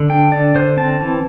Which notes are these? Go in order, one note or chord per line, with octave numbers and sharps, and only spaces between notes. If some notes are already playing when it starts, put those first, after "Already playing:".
Already playing: D3
D4 G5
D3 D5
D3 C5
C4 A5
E3